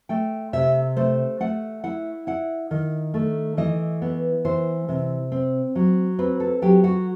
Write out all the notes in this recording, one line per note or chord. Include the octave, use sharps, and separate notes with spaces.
A3 G5
C3 E5
A3 C5
A3 F#5
E4 F#5
E4 F#5
D#3
A3
E3 D#5
B3
E3 C5
C3
C4
F#3
C4 B4
A4
F#3 G4
F#4